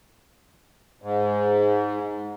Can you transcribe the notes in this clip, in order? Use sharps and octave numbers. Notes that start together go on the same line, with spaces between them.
G#2